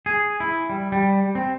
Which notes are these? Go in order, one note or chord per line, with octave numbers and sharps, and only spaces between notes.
G#4
E4
G3
G3
C4